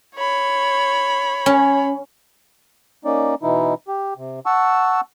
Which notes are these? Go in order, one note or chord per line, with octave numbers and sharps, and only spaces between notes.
C#5 B5
C#4
A#3 C#4 D#4 D5
B2 E3 D#4 E4
G4
C3
F#5 A5 C#6 E6